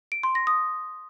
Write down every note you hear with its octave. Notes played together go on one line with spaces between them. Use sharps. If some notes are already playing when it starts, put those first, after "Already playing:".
D7
C6
A#6
D#6